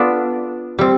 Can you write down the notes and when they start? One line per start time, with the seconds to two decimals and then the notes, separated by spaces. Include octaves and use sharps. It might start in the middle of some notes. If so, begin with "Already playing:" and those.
Already playing: B3 D4 F4 A4 D5
0.79 G3 C4